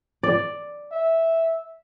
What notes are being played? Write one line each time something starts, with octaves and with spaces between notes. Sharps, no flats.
D5
E5